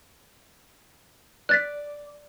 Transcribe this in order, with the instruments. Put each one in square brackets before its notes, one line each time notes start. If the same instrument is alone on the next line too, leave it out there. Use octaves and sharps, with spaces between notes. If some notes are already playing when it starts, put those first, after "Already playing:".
[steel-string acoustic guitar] D5 [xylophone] F#6 A6 B6